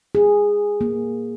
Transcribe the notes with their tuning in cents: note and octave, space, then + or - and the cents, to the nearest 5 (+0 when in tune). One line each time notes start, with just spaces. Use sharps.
G#4 -10
A#3 +10